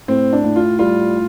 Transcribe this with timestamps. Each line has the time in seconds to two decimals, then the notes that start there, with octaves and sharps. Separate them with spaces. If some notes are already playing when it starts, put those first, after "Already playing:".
0.08 A2 C4
0.33 D4
0.44 A2
0.56 F4
0.79 G3 F4